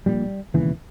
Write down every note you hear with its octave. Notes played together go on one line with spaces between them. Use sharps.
A#1 A#2 G3
E1 D#2 C#3 E3